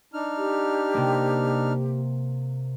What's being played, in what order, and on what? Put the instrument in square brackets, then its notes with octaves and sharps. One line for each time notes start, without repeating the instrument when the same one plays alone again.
[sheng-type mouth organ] D4 D#4 F6
[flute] G4
[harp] C3 A#3